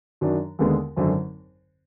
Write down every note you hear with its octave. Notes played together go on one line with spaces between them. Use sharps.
F#2 D#3 F#3 D4
D#2 D3 G#3 B3
G#1 F#2 D3